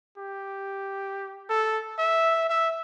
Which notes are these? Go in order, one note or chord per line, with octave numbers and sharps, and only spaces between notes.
G4
A4
E5
E5